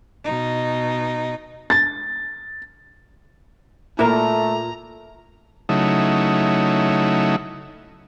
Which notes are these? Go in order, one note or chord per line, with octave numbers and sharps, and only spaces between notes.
B2 D#4
A6
A#2 A3 E4 A#4 A#5
C#3 F#3 A3 D#4 E4